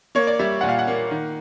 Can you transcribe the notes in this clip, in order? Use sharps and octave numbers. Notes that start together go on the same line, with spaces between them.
A#3 C#5
D5
G3 E5
A#2 F#5
F5
F#5
A#3
D#3